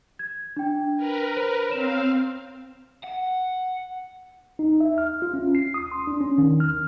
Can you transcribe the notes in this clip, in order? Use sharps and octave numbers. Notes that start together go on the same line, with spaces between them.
G#6
D4 G5
A#4 B4
C5
C4 C#5 F5 E7
F#5
D#4
E5
F6
F4
C#4
C7
D#6
C6
D4
C#4
D#3
F6